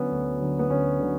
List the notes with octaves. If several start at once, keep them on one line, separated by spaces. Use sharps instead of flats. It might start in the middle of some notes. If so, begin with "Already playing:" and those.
Already playing: D3 F#3 B3 C#4
D2
D3 F#3
B3
D2 C#4
D3 F#3